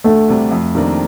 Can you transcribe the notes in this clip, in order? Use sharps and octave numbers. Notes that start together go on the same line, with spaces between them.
D2 A3
C3 G3 D4
F2
C3 D#3 A#3 D4